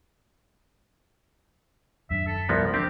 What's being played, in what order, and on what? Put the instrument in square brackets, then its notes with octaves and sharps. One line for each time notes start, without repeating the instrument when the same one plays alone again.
[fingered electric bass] D#1 F#2 D4 [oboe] E5
[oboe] A4
[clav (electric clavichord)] C2 F3 B3 [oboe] A#5
[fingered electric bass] F3 D4 [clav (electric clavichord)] C4 [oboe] G4